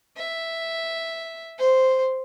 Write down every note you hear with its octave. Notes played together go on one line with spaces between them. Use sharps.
E5
C5